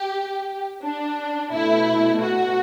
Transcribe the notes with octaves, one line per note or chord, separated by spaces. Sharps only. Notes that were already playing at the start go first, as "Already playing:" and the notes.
Already playing: G4
D4
B2 A3 E4
F#4